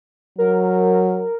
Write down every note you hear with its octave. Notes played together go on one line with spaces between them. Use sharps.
F#3 A#4